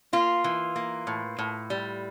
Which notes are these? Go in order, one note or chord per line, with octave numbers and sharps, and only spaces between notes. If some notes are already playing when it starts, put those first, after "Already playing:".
A#3 F4
E3
A#3
A2
A2
G3